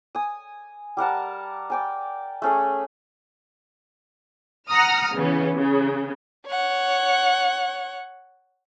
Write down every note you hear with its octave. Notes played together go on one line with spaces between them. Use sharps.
G#5 D#6
G3 A#4 F#5 A5
D5 G5 G#5
A3 C#4 G#4
F#5 A#5 D#6 F6
C#3 E3 B3 C#4
C#3
C#5 F#5